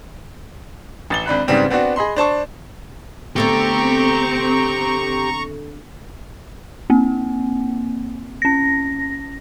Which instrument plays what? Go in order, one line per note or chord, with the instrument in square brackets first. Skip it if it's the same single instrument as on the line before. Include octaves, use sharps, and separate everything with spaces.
[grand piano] A1 A6 G7
G#1 D4 B5 F#6
G#2 C#3 G3 B3 C4 D4
B3 C4 D4 F#4
G#4 D#5 B5 C6
D4 C5 A5 C#6
[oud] D3 A3 B3 [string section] C4 [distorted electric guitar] G4 [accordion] A#5 C#6
[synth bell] A#3 C4
C#4 A#6